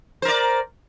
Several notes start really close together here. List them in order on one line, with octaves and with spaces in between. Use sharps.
C5 A#4 D5